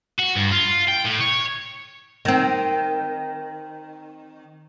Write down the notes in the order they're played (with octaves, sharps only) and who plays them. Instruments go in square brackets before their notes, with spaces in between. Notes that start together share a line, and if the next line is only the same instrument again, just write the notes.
[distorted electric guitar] F#4
G2
F4
G5
A2
C#5
[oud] D#3 C4